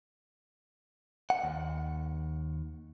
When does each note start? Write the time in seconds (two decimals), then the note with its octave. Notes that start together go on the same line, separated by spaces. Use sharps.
1.30 F#5
1.44 D#2